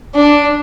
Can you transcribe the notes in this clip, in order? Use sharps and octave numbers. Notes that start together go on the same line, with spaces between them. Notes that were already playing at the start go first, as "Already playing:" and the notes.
D4